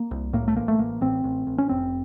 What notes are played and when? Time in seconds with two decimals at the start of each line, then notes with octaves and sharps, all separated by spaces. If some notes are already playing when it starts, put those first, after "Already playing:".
Already playing: A#3
0.11 C2
0.33 A2 A#3
0.48 A3
0.56 A1 A#3
0.68 A3
0.79 A1 A#3
1.01 A1 C4
1.24 A1
1.47 A1
1.58 C#4
1.69 F1 C4